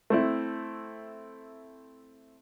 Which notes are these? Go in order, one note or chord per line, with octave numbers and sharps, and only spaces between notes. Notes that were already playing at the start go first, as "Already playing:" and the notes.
A3 C4 E4